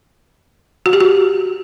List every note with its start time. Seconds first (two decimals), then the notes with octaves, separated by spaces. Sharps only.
0.86 F#4
0.93 G4
1.00 F#4